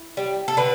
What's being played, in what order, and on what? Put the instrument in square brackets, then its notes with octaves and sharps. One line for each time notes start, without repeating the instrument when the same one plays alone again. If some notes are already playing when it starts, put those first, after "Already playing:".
Already playing: [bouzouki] E4
G3
A4
D3 B4